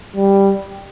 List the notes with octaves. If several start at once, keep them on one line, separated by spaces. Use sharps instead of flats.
G3